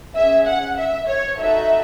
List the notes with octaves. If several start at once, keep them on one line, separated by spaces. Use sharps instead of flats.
C#4 G#4 E5
F#5
E5
C#5
D#4 F#4 A4 E5